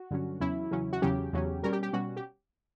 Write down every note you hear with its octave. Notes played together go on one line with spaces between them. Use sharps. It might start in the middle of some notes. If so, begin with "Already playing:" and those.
Already playing: F#4
G2 D3 F#3 C#4
E2 C#3 F#3 C#4 E4
E2 C#3 F#3 C#4
F#4
E2 C#3 F#3 C#4 G4
E2 C#3 F#3 C#4
B2 G3 C#4 A#4
G4
G4
B2 G3 C#4 F#4
G4